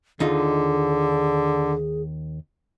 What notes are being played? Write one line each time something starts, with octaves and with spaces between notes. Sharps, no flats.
D#2 D3 D#4 F4 G#4